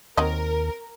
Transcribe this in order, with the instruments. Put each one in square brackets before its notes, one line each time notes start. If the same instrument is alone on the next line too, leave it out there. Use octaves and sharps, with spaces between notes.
[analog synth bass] D#2 [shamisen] F#3 C4 D#5 [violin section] A#4